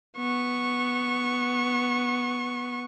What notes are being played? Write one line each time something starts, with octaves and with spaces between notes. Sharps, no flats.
B3 C#6